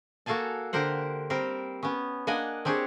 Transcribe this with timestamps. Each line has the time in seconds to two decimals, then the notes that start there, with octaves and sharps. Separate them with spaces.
0.26 A#3 F#4 A4 F5 G#5 A5
0.73 D3 G4 A#4 C5 F#5
1.30 G3 C4 A#4 C5
1.83 B3 C#4
2.27 A#3 D4 D#5 F#5 G#5
2.65 C4 D4 G4 G#4 C#5